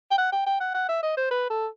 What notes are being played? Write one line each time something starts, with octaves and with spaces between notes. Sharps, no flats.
G5
F#5
G5
G5
F#5
F#5
E5
D#5
C5
B4
A4